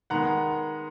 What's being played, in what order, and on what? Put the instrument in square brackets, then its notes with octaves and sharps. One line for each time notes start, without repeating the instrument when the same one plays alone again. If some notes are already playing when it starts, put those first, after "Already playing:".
[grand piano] D#3 G#3 B3 F#5 A#5